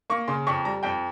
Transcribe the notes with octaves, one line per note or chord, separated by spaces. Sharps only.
A#3 C#6
C#3 C6
F2 C#6
G3 A#5
F2 G5